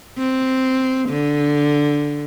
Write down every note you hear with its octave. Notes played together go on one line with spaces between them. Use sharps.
C4
D3